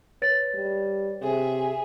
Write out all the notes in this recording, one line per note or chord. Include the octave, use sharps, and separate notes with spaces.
B4 C#5 A6
G3
C3 G#4 E5